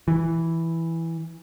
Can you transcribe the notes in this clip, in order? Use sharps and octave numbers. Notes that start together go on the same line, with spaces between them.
E3